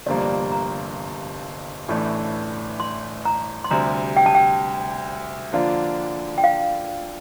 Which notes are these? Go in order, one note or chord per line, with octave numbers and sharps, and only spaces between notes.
G1 F2 C3 G3 A#3 D5
A#5
A1 A2 E3 A3 D4
C6
A#5
C6
D2 C3 G3 A#5
G5
A5
G5
D3 F3 A#3 D4 F4
G5
F5